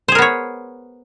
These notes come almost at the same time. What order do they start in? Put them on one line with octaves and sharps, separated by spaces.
C5 G#4 A#4 B3 C#5